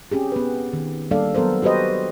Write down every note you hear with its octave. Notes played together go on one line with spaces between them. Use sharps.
C4 C#4 G4 G#4
B3 B4
D#3
G3 A#3 D4 A4 D5 F5
F#3 B3 A4 A#4 C5
F#4 G4 B4 C5 D#5